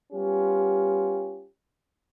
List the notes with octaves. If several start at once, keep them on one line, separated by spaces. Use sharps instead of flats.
G3 B3 C#4 F4 G4